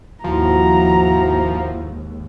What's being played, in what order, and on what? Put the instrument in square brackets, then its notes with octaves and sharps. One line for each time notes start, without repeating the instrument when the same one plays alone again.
[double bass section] D#2 G#2 [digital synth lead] F3 [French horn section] E4 F#4 [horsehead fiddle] A#5